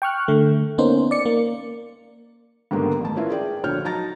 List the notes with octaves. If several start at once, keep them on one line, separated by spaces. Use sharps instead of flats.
G5 C#6 F6 F#6
D3 A3
A#3 B3 C#4 D#4 C5
D5 C#7
A#3
G#2 D3 D#3 G3 A#3 B3
A1 A5
C#4 E4 F4 A#4 B4 E5
G#4 D5 G5
A#1 D3 F#4 C#5 F6 G6
F#3 D#4 A5 A#5 A6 A#6